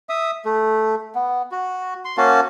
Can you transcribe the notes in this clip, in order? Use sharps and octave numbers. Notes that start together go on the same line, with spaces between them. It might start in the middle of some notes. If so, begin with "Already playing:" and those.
E5 D#6
A3
B3
F#4
C6
A#3 C#4 F#4 A5